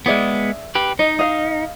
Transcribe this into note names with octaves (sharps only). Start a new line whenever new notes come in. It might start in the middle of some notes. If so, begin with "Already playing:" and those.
G#3 B3 G#4 D5 E5
G4 B4
D#4 D#5
D#5 F5